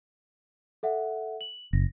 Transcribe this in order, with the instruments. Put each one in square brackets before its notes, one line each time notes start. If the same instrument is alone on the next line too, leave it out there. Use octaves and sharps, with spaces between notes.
[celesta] A4 E5 F#5
F#7
[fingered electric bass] F#1 [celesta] A#6